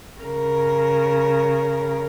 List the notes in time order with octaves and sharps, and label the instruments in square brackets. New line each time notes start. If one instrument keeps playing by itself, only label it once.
[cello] C#3 A#4